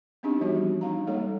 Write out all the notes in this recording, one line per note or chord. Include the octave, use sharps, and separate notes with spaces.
B3 C4 D4 D#4 G4
E3 F3 G3 B3 D4 F#4
C#4 D#4 F5 A#5
G3 G#3 A#3 A4 C#5